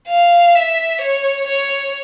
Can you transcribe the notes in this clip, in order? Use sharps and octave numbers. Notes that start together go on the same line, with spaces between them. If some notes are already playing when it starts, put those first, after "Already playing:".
F5
E5
C#5
C#5